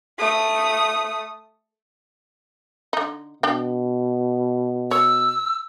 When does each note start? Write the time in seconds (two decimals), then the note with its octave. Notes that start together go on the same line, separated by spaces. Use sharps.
0.18 A3 D#6
2.93 D3 D#4
3.43 B2 D4 G5
4.91 C#5 E6